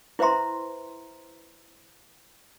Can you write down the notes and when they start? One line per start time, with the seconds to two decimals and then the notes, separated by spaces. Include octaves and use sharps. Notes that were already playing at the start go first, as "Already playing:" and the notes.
0.19 E4 B4 C5 E5 A#5 C6